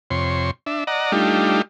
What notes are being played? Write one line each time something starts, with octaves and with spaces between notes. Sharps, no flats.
F2 C3 C#5 C6
D4 E5
D5 D#5 F#5 A#5
G3 A3 D4 D#4 F4 G4